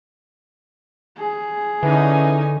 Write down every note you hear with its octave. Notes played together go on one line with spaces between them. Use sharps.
G#4
D3 E3 C#4 D#4 G#5